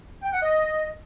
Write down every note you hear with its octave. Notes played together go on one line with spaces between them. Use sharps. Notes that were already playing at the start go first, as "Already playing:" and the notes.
G5
F#5
D#5